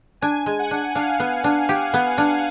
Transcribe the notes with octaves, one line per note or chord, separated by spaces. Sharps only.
D4 G#5
G#3
F#5
D4
D4 F5
B3
D4
G4
B3
D4